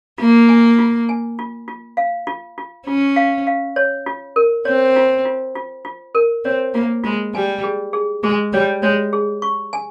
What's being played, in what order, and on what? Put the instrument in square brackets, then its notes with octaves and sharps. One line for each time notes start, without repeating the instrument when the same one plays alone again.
[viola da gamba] A#3 [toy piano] F4
[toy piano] G#5
F4
G#5
F4
F4
F5
F4
F4
[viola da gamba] C#4 [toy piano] F4
[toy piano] F5
F5
C#5
F4
A#4
[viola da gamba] C4 [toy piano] C#5
[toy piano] F4
F4
F4
F4
A#4
[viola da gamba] C4 [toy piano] C#5
[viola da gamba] A#3 [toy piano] F4
[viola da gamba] G#3 [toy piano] F4
[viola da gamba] G3 [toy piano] G#5
[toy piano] G#4
G#4
[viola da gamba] G#3 [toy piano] G#4
[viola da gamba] G3 [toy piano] C#5
[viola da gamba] G#3 [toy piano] C#5
[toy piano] G#4
C#6
G#5